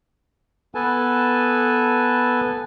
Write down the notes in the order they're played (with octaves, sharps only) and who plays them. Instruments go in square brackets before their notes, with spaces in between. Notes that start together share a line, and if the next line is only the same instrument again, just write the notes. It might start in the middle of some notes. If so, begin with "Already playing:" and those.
[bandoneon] B3 A4 B4 G#5 A5